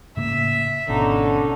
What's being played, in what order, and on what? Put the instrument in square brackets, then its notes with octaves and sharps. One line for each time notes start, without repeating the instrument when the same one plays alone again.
[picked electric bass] A2 C#3 A#3 [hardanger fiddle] E5
[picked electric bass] G#1 B2 [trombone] D3 [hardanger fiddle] C#4 D#4